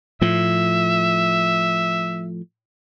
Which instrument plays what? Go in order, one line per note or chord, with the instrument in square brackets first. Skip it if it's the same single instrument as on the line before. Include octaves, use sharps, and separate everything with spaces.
[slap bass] A2 F3 [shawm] E5